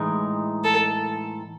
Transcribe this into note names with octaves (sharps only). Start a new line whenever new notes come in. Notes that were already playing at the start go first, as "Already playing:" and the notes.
Already playing: A2 E3 G#3 D#4
A4